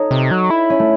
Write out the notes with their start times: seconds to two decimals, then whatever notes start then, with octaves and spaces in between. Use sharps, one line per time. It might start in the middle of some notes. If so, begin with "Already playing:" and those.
Already playing: D#4 A4 C#5
0.11 C3
0.31 F#3
0.50 E4
0.70 C#4
0.79 A3